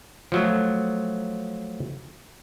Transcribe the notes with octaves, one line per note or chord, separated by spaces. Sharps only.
F3 F#3 A3